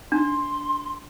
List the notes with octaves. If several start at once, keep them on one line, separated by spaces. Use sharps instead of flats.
D4 C6